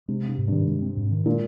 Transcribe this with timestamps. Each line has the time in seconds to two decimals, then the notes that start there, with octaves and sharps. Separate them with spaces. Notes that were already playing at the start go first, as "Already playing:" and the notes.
0.08 C3 G#3
0.23 C3 C4
0.38 G#2
0.48 G2 D#3
0.67 G2 G#3
0.82 C4
0.97 G#2
1.11 D#3
1.26 A#2 G#3